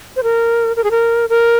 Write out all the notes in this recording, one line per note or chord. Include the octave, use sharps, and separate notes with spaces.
C5
A#4
A#4
G#4
A#4
A#4